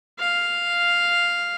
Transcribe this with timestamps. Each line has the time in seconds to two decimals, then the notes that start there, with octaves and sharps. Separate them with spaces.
0.19 F5